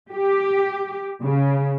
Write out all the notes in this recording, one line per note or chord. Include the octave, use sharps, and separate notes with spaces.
G4
C#3